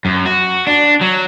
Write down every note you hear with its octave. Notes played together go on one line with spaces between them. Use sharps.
F#2
F#4
D4
F#3